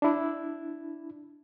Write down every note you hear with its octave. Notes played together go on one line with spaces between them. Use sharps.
D4 E4